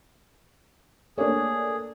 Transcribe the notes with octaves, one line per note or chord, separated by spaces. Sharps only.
A3 A#3 D4 G#4 C#5